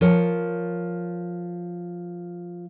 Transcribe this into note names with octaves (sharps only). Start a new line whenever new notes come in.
F3 A#4 C#5